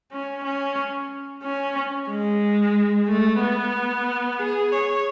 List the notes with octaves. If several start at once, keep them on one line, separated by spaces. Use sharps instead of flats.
C#4
C#4
C#4
G#3
A3
B3
G#4
C#5